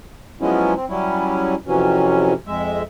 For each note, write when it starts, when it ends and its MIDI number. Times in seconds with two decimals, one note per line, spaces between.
0.41 0.74 53
0.41 0.74 54
0.41 0.74 56
0.41 0.74 59
0.41 0.74 61
0.41 0.74 64
0.76 0.85 60
0.89 1.55 54
0.89 1.55 55
0.89 1.55 61
0.89 1.55 64
1.67 2.33 41
1.67 2.33 48
1.67 2.33 52
1.67 2.33 54
1.67 2.33 61
2.47 2.82 41
2.47 2.82 56
2.47 2.82 76